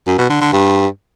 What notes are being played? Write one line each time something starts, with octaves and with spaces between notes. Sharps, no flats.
F#2
B2
D3
D3
G2